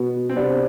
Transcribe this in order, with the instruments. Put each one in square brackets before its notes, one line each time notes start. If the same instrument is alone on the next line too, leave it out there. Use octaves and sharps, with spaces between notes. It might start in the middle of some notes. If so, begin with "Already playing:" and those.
Already playing: [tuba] B2 [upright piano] B3
[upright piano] C4
[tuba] C3 [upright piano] B3 D4